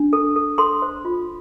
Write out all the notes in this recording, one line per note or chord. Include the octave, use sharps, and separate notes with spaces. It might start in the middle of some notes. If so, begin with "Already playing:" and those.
Already playing: D4
A4
A4
A4 C6
C5
F4